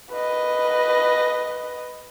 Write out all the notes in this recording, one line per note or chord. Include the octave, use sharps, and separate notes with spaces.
B4 D#5